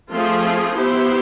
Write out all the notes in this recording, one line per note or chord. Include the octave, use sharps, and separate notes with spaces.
F3 A3 C4 F4 G#4
B3 E4 G4 C5